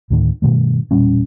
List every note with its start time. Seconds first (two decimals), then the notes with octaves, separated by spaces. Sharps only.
0.10 D2 A2 D3 D#3
0.42 G2 B2 D#3 A3
0.91 E1 A#2 G3 C#4